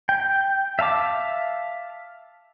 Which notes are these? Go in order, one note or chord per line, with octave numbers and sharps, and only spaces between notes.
G5
E5 F5 A5 D6